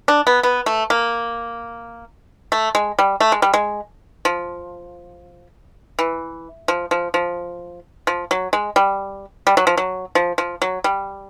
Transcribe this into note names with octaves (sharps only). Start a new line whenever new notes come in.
D4
B3
B3
A3
A#3
A3
G#3
G3
A3
G#3
G3
G#3
F3
E3
F3
F3
F3
F3
F#3
G#3
G3
G3
F#3
F3
F#3
F3
F3
F#3
G3